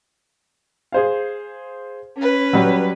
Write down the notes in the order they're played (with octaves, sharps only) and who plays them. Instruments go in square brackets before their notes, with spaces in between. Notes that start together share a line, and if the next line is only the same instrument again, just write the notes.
[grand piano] G#4 C5 F5
[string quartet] C#4 B4
[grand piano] F#3 G3